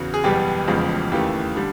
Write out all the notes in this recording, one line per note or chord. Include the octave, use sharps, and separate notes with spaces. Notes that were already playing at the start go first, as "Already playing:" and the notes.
Already playing: E2 C#3 F#4
G#4
F#1 E2 B2 G3 B3 G4
F1 E2 C#3 F3 G#3
D#2 C#3 E3 A3 G4
D3 G3